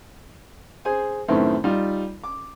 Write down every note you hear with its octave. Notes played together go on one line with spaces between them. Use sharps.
G#4 C5 G#5
F#2 A2 D#3 A3 B3 C4
G3 D#4 F4
D6